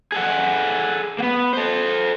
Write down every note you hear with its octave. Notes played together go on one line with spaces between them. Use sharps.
G#4 A4 F#5
A#3 B3
A4 C5